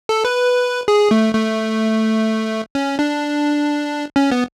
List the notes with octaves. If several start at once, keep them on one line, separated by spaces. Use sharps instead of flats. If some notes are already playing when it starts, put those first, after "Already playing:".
A4
B4
G#4
A3
A3
C#4
D4
C#4
B3